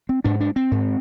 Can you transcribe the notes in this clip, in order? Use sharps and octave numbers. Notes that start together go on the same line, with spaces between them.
C4
G#2 D4
D4
C4
G#2